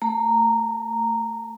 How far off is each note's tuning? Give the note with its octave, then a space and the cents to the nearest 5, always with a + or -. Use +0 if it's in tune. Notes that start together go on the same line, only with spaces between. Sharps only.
A3 +20 A#5 -10